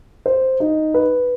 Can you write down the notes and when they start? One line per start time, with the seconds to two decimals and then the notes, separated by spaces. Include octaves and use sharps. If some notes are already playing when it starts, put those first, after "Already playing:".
0.26 C5
0.60 D#4
0.94 B4